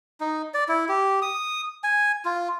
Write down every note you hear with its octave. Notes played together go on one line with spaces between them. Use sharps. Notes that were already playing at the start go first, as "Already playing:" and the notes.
D#4
D5
E4
G4
D#6
G#5
F4